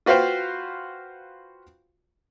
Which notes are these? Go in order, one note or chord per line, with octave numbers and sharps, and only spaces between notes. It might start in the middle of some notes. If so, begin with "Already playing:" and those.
F4 F#4 B4 C5 F5 G5